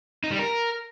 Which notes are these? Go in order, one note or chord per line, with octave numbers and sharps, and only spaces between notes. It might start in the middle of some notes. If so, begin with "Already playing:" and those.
D#4
G3
A#4